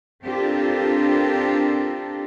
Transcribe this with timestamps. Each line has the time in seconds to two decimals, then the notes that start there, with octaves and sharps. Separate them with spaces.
0.24 C4 D4 F4 G4 A4 A#4